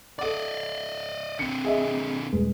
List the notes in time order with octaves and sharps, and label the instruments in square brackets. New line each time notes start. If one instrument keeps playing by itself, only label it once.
[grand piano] A4 F#5 D6 [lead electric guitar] D5 D#5
[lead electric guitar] D3 C4 [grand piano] C#7
[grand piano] G#4 D#5 E5
D#1 G#3 B4